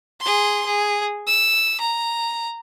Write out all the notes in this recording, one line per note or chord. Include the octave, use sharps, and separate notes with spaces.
G#4 C6
G#4
E6
A#5